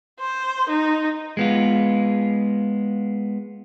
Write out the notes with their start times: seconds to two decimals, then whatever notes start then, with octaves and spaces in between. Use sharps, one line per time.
0.20 C5
0.69 D#4
1.37 G#3 B3 F4